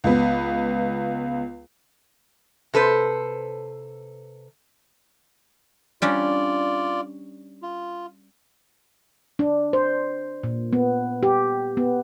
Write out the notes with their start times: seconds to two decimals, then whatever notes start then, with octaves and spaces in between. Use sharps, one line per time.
0.04 C#2 B3
2.73 C3 A4 B4 C5
6.02 G3 C#4 D4 F4 D5
7.63 F4
9.39 D4
9.73 C5
10.43 A#2
10.73 B3
11.23 G4
11.77 B3